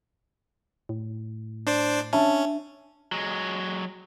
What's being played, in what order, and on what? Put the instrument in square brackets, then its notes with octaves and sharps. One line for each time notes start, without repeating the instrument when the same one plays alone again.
[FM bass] A2
[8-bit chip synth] D4 C5 D5
[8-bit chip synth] C#4 [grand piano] D4 E5 A5
[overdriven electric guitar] F#3 G#3